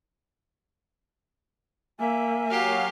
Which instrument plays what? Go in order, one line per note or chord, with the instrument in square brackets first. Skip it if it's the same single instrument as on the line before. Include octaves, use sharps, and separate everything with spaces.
[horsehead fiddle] A#3 [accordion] E5 [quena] G#5
[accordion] F#3 F5 F6 [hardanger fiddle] G4